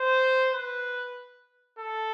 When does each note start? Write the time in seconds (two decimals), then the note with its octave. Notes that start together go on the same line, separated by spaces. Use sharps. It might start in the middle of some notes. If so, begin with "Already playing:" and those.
Already playing: C5
0.54 B4
1.79 A4